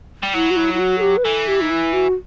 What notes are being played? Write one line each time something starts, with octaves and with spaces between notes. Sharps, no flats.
G3
F#3 E4
F#4
E4
E4
F#4
A4
G4
B4
E3 A4
G4
D#4
E4
F#4